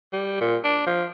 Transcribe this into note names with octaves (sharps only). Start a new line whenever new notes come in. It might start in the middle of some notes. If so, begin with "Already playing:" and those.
G3
A#2
D4
F3